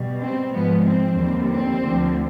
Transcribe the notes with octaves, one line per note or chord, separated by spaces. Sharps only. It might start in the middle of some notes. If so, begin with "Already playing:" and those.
Already playing: B2 G3
C4
G#2 F3 G#3 B3
C4
D#2 D3 G3
C4
D2 D3 F3